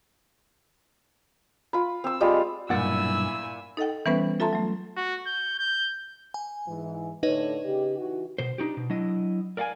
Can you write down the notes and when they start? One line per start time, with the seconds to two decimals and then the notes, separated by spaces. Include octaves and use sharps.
1.73 F4 B5
2.04 C4 E6
2.21 G3 G#3 F4
2.70 B1 G2 A#2 E4 F#5 G#5 E6 A6
3.77 D#4 A4 D#5 F#5 G5
4.06 E3 G3 B3 C#4 B4 C5
4.40 F4 A4 E5 A5 A#5 C6
4.53 F#3 A3
4.97 F#4
5.27 G6
5.59 G6
6.34 G#5
6.68 G#2 E3
7.23 A2 D3 D#4 B4 C#5 D#5
7.64 C#3 G4
7.98 E3 F#4
8.38 B2 C5
8.58 D4 D#4 F#4 G4
8.77 B2
8.90 F#3 D4 E4 D#5
9.57 A#4 D5 F5 F#5 G#5